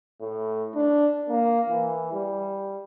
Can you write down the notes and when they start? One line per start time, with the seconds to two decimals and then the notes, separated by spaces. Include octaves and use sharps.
0.21 A2
0.75 D4
1.29 A#3
1.70 E3
2.13 G3